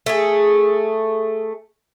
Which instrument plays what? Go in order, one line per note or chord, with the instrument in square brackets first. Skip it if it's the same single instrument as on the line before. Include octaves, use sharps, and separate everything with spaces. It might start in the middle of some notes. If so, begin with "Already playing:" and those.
[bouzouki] A3 G#4